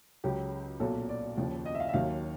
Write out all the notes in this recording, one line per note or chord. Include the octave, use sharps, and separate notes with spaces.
C#2 C#3 F#3 G4
B1 A#2 F#3 A4
D5
D#2 C#3 F3
D#5
E5
F5
E5
D#2 D#3 F#3 F5